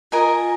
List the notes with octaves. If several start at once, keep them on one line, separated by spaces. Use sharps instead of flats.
F4 A#4 D#5 G#5